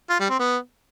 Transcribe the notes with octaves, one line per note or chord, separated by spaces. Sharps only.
F4
G3
C4
B3